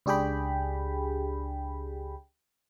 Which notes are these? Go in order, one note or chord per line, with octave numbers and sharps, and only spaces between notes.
C#2 D4 G4 G#4 G5 B5